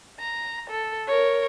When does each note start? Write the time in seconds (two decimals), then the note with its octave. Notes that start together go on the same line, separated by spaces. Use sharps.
0.19 A#5
0.70 A4
1.07 A#4 C#5